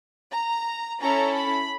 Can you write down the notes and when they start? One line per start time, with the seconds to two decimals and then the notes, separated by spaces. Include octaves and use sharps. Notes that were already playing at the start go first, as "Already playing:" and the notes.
0.30 A#5
0.99 C#4 E4 A4 A#5
1.34 B5